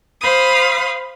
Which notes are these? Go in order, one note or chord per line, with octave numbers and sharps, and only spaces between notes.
C5 F5 B5 D#6